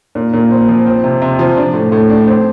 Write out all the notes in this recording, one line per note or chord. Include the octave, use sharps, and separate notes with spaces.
A#2
A#2
C4
F3
C4
C3
C3
F3
D4
A2
A2
D4
C4